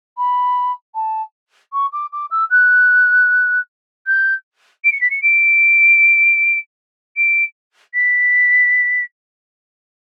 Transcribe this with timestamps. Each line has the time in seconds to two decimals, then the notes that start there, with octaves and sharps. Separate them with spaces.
0.17 B5
0.94 A5
1.72 C#6
1.92 D6
2.12 D6
2.30 E6
2.50 F#6
4.06 G6
4.84 D7
4.92 C#7
5.01 B6
5.10 C#7
5.22 D7
7.17 D7
7.94 B6